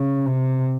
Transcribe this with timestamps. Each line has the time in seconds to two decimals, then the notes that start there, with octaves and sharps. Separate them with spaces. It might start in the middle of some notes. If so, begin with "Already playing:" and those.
Already playing: C#3
0.26 C3